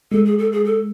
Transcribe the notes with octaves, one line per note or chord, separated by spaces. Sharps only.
G#3 A4
G#4
A4
G#4
A4